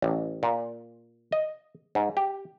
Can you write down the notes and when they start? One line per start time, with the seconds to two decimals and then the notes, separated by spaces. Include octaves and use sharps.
0.02 A1
0.43 A#2
1.32 D#5
1.95 G#2
2.17 G4